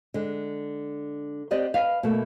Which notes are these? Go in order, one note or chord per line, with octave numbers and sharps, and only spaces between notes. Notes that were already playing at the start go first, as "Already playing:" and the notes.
D3 G#3
C4 G4 D5 D#5 F#5
B4 D#5 F5
B2 A3 A#3